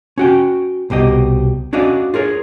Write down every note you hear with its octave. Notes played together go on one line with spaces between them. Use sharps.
C#4 F#4 G5
C2 B2 G4 D#5
C#4 D4 F#4 D5 D#5 F5
F4 G#4 A#4 C#5